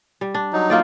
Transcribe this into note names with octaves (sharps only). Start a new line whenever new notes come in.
G3
D4
F#3 D#4
A#3 F4 D5